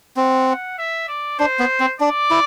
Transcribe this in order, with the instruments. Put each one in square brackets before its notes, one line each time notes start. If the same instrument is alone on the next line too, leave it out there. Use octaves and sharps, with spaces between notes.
[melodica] C4 [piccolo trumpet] F#5
[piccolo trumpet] F#5
E5
D5
[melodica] D4 [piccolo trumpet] C5
[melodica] B3
C4
[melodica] D4 [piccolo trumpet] D5
[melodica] E4